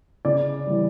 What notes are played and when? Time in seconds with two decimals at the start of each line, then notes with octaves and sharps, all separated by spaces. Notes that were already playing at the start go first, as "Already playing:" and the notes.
0.25 C#3 D5
0.67 E3 G3